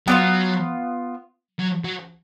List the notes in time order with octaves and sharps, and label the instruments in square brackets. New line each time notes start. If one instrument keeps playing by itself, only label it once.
[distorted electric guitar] F#3 [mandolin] B3 D4 F4
[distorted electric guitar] F#3
F#3